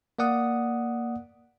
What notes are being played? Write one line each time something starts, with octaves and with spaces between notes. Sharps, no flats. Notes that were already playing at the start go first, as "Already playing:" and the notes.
A#3 D5 F#5 D#6